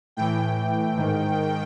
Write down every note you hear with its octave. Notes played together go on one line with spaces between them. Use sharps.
A2 E3 G5
G#2 D#3